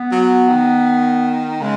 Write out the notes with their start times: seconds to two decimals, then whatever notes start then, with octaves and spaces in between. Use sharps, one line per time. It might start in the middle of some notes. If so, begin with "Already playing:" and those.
Already playing: B3
0.12 F#3
0.48 D#3
1.61 C#3 G#3